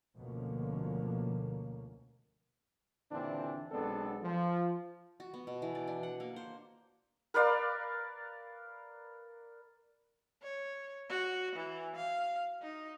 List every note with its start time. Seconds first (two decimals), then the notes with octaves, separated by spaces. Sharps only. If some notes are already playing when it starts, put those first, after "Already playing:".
0.17 D2 B2 D3 F3 A#3 C#4
3.12 D#2 A#2 D3 E3 C4 D4
3.72 B1 G#3 B3 C4 D4 A4
4.23 F3
5.20 F#4
5.34 B3
5.47 B2
5.62 E3
5.75 D5
5.87 D4
6.03 F#5
6.20 A#3
6.36 C5
7.34 A#4 B4 D5 F5
10.43 C#5
11.09 F#4
11.56 E3
11.96 F5
12.62 D#4